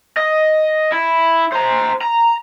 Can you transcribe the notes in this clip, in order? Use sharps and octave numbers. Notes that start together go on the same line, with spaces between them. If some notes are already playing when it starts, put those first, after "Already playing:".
D#5
E4
C5 A#5
A#5